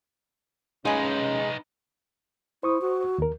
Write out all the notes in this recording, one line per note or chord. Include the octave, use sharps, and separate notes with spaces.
G#3 C#4 D#4 F4 G#4 B4
E4 C5 C#6 D#6
F#4
D#2 A#4